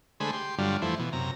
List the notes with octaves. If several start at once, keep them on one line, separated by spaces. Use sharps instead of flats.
D3 G#3 A3 G#4 C5 B5
G4 C6
G2 D3 F#3 G3 F4
F2 E3 A3 E4 C5
B2 E3
F#2 C3 A#5